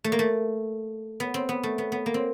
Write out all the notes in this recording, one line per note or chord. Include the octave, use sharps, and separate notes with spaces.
A3
A#3
A3
B3
C4
B3
A3
B3
B3
A#3
C4